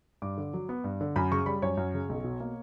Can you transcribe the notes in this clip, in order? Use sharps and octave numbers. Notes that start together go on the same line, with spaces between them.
G2 D6
D3
F#3
B3
G2
D3
F#2 B5
C#3 C#6
G3 B5
F#2 C#5
F#2
C#3
B1
B2
A#3